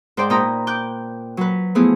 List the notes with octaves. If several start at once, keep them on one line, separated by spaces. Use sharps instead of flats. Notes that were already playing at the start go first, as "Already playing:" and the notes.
G#2 C5 D5 G5 D6
A#2 D#4 G5 A#5 B5 D#6
G5 D6 F#6 G6
F#3 B4
F3 A3 B3 E4 G#4